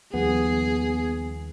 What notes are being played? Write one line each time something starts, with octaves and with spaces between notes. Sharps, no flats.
D#2 F3 G3 B3 G#4